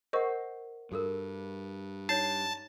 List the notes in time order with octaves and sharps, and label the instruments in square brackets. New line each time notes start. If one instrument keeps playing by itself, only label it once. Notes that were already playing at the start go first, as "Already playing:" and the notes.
[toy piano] A#4 F#5 [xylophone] C5 D#5 C#6
[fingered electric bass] G2 [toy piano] F#4 A4 A#4
[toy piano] D#4 C#5 [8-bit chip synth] A5 [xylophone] C7